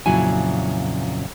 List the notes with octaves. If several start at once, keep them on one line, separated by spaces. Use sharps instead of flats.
F2 A#2 C#3 F#3 E4 G#5